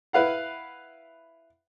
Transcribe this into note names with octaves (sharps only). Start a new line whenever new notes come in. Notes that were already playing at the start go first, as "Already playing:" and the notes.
E4 B4 F5 F#5